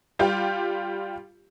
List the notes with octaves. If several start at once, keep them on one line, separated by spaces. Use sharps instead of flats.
G3 F4 G4